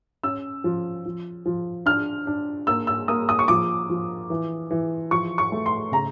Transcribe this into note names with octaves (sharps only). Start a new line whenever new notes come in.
C#4 E6
F3
F3
F3
D4 F6
D4
A#3 E6
E6
A#3 D#6
D#6
C#6
F3 D6
F3
E3
E3
F3 C#6
C#6
A3
C6
C#3 A#5